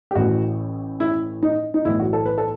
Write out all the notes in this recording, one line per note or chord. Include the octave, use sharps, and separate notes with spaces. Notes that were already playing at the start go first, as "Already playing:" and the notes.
G4
A1 A2 E3 F#4
E4
D#4
D#4
B1 A2 E3 E4
F#4
A4
B4
A4